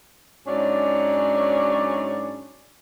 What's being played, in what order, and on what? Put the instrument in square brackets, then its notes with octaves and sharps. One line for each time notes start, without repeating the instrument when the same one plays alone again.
[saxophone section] G#2 F#3 C#4 D4 D5